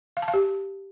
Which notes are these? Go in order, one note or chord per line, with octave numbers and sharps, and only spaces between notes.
F5
A5
F5
G4